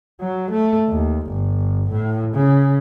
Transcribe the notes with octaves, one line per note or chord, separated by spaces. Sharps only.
F#3
A3
D#2
G1
A2
C#3